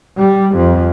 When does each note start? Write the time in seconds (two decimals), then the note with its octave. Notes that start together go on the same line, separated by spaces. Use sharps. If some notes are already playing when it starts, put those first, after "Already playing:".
0.18 G3
0.55 F2